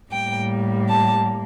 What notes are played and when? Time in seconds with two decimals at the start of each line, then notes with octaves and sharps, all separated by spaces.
0.11 A2 G3 A#3 G5
0.88 A5